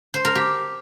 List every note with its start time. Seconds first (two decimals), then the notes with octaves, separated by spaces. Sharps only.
0.14 C5
0.25 A#4
0.35 G4